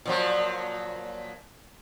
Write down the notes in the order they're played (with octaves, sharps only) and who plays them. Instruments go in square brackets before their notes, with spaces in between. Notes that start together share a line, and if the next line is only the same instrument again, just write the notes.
[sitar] A#2 F3 F#3